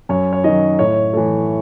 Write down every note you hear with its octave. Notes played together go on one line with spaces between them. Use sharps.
F#2 C#5
C#5
D#3 F#3 D#5
A2 C#5
E3 A3